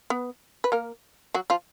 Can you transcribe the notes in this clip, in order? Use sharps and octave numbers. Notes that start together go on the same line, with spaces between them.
B3 B4
B4
A#3 A#4
F#3 F#4
F3 F4